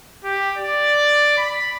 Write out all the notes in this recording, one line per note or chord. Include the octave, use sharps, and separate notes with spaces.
G4
D5
B5